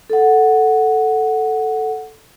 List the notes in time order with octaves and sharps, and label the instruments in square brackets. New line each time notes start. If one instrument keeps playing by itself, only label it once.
[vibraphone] A4 F#5